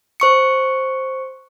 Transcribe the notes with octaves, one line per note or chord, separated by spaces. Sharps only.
C5 C#6 C#7